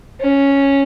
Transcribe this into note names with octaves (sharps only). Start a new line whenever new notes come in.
C#4